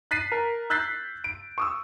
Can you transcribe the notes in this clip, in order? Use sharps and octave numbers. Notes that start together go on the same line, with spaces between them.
F#6 A6 B6 C7 D#7
A#4
E6 F#6 G6 A6 B6 C7
D7
C#6 D#6 E6